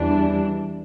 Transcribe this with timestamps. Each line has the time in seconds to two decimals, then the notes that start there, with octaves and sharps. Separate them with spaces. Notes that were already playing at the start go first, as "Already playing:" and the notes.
Already playing: E2 E3 G3 D4